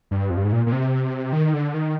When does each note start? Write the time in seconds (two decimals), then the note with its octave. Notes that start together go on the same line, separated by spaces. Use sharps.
0.11 G2
0.30 F2
0.37 G2
0.45 G#2
0.52 A#2
0.67 A#2
0.72 C3
1.33 D#3
1.54 D3
1.74 D#3